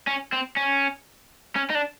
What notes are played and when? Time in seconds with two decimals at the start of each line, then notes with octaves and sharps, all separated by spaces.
0.07 C#4
0.33 C4
0.57 C#4
1.56 C#4
1.70 D#4
1.75 D4